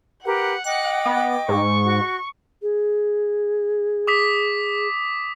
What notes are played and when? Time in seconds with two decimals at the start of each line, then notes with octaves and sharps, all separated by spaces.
0.24 G4 A#4 B4 F#5
0.64 D#5 G5 D6 F#6
1.05 B3
1.48 G#2 C#6
1.85 F#4
2.62 G#4
4.07 D6 D#6 B6